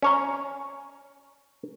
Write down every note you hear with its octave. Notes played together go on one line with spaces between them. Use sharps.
C#4 C#5 A#5